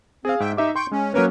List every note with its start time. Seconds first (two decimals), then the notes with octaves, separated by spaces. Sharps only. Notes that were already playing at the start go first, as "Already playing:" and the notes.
0.25 C4 G#4 F5
0.40 G#2 E5 G5
0.57 D#4 G4 E5 D6
0.76 G5 C6 C#6 G6
0.92 G#3 C#4
1.14 F#3 A#3 C#4 A#4 B4 C#5